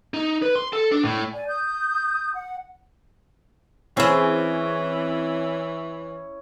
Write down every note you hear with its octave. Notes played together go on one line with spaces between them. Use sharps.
D#4
B4
C6
A4
D4
A2
D5 G#5
D#6 G6
F#5
E3 C4 C#4 E4 G#4 C6